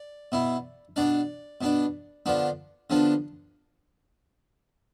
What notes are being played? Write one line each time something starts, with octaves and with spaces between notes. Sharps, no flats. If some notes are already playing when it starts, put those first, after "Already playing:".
Already playing: D5
B2 B3 E4
B2 B3 D4 D5
B2 B3 D4
D3 F3 B3 D4
D3 F3 B3 D4